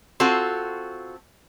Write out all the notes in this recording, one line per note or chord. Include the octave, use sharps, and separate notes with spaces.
C4 F4 F#4 A4